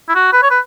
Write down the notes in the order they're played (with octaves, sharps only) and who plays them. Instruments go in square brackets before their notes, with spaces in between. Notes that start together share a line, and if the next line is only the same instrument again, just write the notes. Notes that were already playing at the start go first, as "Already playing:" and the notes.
[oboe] E4
F#4
B4
C#5
B4